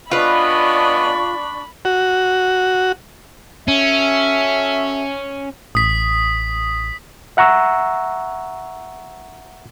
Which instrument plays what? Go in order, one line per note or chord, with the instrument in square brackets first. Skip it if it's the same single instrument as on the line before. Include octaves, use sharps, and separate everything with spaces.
[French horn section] C#3 B3 D#5 [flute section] D4 C#6 [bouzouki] F4 B4 [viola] B5
[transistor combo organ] F#4
[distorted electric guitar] C#4 [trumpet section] F#4 A4 E5
[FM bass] A1 [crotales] D#6 B6
[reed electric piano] E5 F#5 A#5 C#6 E6